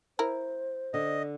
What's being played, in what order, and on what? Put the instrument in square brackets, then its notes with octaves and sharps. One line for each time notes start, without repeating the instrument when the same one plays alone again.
[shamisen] E4 A#4 [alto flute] C5
[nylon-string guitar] D3 [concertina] D#5